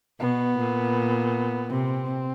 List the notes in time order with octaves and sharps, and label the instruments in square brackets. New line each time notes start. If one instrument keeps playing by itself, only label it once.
[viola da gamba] B2 [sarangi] B3
[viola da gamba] A#2
[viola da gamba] C3 [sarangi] C4